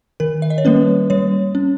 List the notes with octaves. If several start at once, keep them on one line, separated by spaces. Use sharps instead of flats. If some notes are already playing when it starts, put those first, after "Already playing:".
D#3 A#4
E5
D#5
C#5
G3 A#3 C#4 B4
G3 C#5
C#4